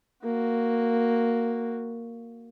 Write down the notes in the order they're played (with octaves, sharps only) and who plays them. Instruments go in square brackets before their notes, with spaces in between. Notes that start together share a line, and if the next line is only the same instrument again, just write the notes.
[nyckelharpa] A#3 F#4